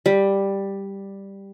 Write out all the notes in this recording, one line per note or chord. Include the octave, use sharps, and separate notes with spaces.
G3